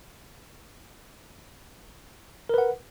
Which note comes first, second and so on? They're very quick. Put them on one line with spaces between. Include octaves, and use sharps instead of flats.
A#4 B4 F#5